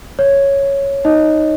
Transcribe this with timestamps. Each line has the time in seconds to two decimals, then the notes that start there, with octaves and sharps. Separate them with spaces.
0.19 C#5
1.05 D#4 D#5